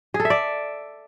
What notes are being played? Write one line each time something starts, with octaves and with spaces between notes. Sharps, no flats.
G#4
A4
E5
D5